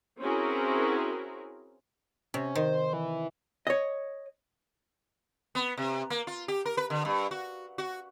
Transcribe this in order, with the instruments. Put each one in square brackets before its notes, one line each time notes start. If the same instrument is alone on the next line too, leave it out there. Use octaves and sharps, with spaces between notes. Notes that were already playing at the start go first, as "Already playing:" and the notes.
[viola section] C4 C#4 E4 F#4 G#4 A#4
[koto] C3 [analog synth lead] C#4
[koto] D#3 [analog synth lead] C5
[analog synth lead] E3
[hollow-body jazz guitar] C#5 D#5
[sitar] B3
C3
A#3
F4
G4
A#4
B4
D3
G2
F#4
F#4